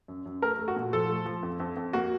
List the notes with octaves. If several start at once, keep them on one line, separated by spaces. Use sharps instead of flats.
F#2
F#2
A3 A#4
A3
F#4
A#2
F3 A4
A3
F3
F2
F2
F2
A#3 F#4